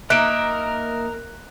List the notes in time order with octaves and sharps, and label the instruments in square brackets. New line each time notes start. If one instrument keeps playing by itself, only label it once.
[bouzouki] A#3 D#4 E5 [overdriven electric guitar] A#4 [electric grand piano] F#6 D7